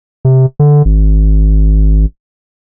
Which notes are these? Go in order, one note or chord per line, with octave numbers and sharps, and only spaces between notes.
C3
D3
G#1